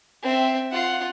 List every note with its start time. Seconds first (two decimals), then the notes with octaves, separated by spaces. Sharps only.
0.23 C4 E5
0.71 F4 F#5